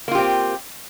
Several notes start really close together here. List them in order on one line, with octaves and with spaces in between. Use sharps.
A#3 F4 G4 C4